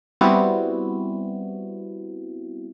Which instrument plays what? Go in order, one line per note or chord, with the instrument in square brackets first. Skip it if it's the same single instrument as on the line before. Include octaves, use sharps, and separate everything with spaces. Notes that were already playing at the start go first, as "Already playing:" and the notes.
[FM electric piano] G3 B3 C4 E4 F#4